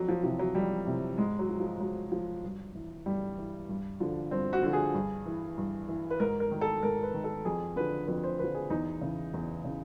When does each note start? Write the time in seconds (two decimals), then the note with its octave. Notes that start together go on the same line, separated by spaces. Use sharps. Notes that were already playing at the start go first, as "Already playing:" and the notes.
Already playing: F2 F#3
0.09 F3
0.24 C3 E3 F3
0.39 F#3
0.55 F2 G3
0.87 C3 E3
1.18 G#2 G#3
1.39 F#3
1.49 F3
1.60 F3
1.80 G#2 F#3
2.12 F3
2.43 G2
2.75 E3
3.06 G2 G3
3.37 E3
3.69 G2
4.00 D3 F3
4.31 G2 C4
4.53 F#4
4.63 D3 F3
4.73 G#4
4.94 G2
5.26 E3
5.58 G2
5.88 E3
6.10 B4
6.20 G#2 A#4
6.40 A#4
6.51 D#3
6.61 A4
6.83 G#2 A#4
7.03 B4
7.14 D#3
7.24 A4
7.45 F2 G#4
7.76 D3 F3 B4
8.07 F2 B4
8.24 C5
8.39 D3 F3 B4
8.55 G#4
8.70 E2 D#4
9.01 C#3 E3
9.34 E2
9.64 C#3 E3